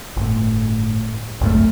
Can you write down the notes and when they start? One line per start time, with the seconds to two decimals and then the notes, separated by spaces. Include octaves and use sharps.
0.17 G1 A2
1.41 G#1 C#2 F#2 A3